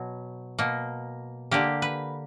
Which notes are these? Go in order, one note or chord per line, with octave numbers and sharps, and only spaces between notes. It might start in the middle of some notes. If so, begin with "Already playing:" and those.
Already playing: B2 F#3
B2 A#3
D3 A#3 G4
B4